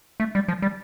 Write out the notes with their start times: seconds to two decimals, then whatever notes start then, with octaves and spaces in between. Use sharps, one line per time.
0.20 A3
0.35 G3
0.48 F3
0.62 G3